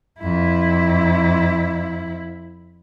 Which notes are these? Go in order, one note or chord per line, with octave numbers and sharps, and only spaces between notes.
F2 E4